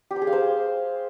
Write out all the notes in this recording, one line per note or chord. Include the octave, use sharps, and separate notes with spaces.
G4
C6
G#4
F5
C5